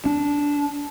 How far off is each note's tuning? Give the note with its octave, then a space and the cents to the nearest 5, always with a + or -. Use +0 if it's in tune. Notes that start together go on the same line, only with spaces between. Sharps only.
D4 -15